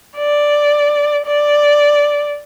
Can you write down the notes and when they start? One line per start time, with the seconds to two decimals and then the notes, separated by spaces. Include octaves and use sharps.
0.18 D5
1.27 D5